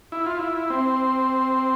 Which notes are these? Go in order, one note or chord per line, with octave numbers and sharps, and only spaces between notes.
E4
F4
E4
C4